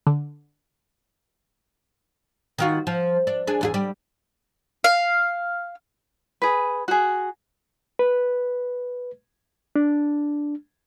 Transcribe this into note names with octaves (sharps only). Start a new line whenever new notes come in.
D3
D#3 F4 F#4
F3
D4
D4 G#4
E2 F4 G#4
G3 G4
F5
G#4 B4
F#4 G#4
B4
D4